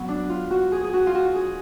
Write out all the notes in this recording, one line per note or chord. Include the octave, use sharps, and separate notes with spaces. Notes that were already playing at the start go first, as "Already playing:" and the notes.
Already playing: F#3 B3
D4
F4
F#4
G#4
G#4
F#4
F4
F#4
G#4